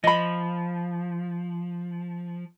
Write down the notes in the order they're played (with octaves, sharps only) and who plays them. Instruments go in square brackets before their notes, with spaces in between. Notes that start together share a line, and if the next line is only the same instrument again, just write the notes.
[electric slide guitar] F3 [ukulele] D#5 B5